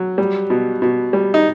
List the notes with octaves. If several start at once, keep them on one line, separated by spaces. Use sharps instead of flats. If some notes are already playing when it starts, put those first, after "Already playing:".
Already playing: F#3
G3
B2
B2
G3
D#4